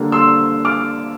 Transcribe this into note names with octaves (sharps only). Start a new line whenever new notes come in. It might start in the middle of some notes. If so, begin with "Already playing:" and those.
Already playing: D3 G3 A#3
C6 E6
D6 F6